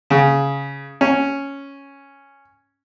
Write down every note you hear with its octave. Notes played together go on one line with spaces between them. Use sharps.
C#3
C#4